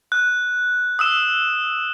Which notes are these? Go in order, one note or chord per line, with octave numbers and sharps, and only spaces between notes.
F#6
D#6 E6 E7